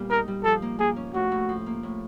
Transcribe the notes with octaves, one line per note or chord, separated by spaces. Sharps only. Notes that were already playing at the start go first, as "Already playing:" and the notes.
Already playing: A#2 G3 B3
D#4 A#4
G3
F3 A4
A#3
A#3 G#4
C#4
A2 F#4
A2
F3
A#3
A2